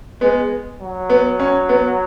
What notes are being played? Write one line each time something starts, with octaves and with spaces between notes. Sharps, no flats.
G#3 B3
F#3
B3
C#4
B3